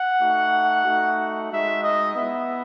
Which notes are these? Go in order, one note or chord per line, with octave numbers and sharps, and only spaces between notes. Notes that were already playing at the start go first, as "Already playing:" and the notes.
Already playing: F#5
A3 D#4 F#4
A3 D#4 F#4
G#3 D#4 F#4 E5
D#5
B3 E4 E5